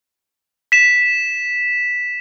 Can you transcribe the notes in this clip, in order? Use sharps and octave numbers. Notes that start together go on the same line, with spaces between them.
B6 E7